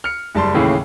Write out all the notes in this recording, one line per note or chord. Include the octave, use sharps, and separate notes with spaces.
F6 C#7
F#1 G3 A5 C6
D#2 A2 C#3 E3